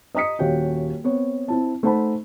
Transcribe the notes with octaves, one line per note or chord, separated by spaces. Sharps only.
D#5 A#5 D#6 B6 C#7
D#1 F#4 G4 C#5 F5 G5
B3 C4 C#5
C4 E4 A5
A3 D#4 C5 F#5 A5 B5